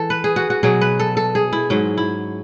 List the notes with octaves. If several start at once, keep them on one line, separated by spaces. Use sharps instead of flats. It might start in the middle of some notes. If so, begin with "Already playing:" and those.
Already playing: E3 A4
B4
G#4
F#4
F#4
B2 F#3 G#4
B4
A4
A4
G#4
E4
G#2 F#3 C#4
E4